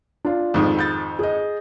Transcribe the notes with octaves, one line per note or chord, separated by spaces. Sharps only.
D4 F4
F2 G#2 D#3
B5 G6 A6
G#4 D#5